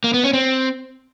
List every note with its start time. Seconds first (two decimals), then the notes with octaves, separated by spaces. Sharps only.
0.04 A#3
0.14 B3
0.24 C#4
0.33 C4